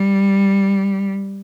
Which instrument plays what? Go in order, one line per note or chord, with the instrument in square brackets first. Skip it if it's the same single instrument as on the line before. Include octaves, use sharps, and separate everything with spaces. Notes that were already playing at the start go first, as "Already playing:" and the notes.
Already playing: [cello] G3